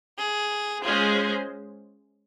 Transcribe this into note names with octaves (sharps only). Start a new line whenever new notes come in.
G#4
G#3 C#4 F4 G#4 C5